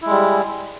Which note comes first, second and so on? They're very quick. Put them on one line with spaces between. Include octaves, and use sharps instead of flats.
E4 G#3 G3